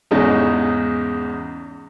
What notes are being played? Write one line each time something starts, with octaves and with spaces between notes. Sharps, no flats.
E2 G#2 C#3 D#4